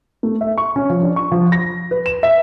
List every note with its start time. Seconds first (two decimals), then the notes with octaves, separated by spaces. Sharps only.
0.23 A3
0.41 E5
0.58 C#6
0.76 C#4
0.90 F3
1.03 D4
1.16 C#6
1.32 F3
1.52 A#6
1.91 B4
2.06 E7
2.23 E5